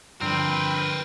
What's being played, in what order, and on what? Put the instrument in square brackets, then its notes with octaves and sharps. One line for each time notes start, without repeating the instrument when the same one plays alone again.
[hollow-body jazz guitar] G2 D3 F3 [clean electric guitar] C4 [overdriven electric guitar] A#4 B4 [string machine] G5